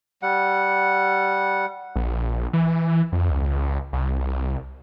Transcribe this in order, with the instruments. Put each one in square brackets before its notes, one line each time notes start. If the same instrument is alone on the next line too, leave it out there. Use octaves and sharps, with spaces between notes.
[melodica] G3 F#5
[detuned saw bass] A#1
E3
F2
C#2
C2